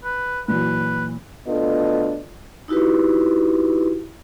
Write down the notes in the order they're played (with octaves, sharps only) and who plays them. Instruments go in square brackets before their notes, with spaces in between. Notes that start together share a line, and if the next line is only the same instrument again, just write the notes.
[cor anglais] B4
[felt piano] A#2 E3 F#3 [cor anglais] B4
[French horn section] D2 B3 D4 F4 A4 D#5
[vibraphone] D#4 E4 F#4 G4 B4